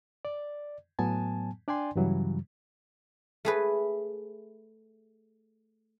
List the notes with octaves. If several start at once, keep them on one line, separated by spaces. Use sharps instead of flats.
D5
A2 F#3 B3 G#5 A5
D4 D5 G5 G#5 C6
G2 C#3 E3 F#3 G3
A3 G#4 B4